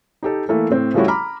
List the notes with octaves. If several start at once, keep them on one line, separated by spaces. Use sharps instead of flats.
D#4 G4 A4
E3 A3 A#3 A4
A2 C4
F3 G3 A3 C#4 E4 F#4
A#5 B5 D6 F6